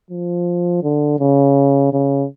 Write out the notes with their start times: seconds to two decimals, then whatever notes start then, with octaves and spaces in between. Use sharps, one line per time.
0.10 F3
0.83 D3
1.19 C#3
1.93 C#3